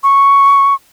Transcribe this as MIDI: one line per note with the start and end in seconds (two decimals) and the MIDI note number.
0.03 0.74 85